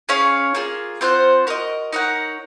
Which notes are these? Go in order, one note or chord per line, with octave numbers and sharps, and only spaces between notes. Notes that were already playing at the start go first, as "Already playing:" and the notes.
C#4 G#4 C#5 F5
A#3 F4 G#4
C4 F4 C5 F#5
F#4 A#4 D#5
D#4 A#4 C#5 F#5